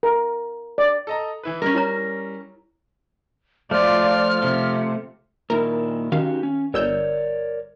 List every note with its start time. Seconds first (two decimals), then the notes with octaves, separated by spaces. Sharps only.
0.03 A#4
0.78 D5
1.07 A4 D#5 A#5
1.43 E3 E4 B4
1.62 G3 C#4 A#4
1.74 E4 C#5 A#5
3.71 F3 A3 F4 D5 F6
4.41 C3 F3
5.50 A#2 D#3 E4 A#4
6.12 D#3 C#4 F#4 G4 F5
6.43 C#4
6.74 G1 A#4 C#5 D5 E6 G6